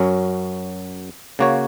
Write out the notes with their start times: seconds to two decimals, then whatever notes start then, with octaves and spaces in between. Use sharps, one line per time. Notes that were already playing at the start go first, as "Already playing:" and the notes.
Already playing: F#2 F#3 C#4
1.39 C#3 A#3 F#4 C#5